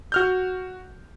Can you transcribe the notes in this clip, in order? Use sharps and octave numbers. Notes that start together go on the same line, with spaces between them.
F#4 F6 G6